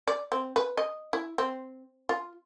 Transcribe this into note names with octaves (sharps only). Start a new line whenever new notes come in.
D5
C4
B4
D#5
E4
C4
F4